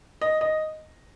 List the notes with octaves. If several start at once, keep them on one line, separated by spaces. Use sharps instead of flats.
D#5
D#5